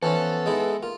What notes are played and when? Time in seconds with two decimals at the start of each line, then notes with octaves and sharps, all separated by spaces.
0.03 E3 F3 B3 C#4 A4
0.46 G#3 D#4 E4
0.83 A#3 F4